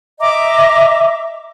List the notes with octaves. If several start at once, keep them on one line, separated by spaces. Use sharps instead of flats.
D#5 E5 A#5 D6